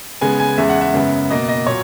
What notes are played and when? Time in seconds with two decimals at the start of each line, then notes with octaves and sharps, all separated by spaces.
0.21 C#3 G#3 B3 G#5
0.40 G#5
0.58 E2 C#3 G#3 E5
0.69 F#5
0.81 E5
0.94 F#2 C#3 G#3 B3
1.31 B2 A#3 D#5
1.49 D#5
1.67 A#2 F#3 C#5